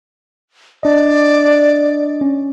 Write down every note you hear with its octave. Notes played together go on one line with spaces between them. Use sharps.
D4 D5 D#5
C#4